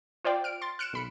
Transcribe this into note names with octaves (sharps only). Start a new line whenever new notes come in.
F4 C5 D5 G5
F6 D7
C6 A6
F6 F#6 C#7 D7 E7
B1 B5 C#7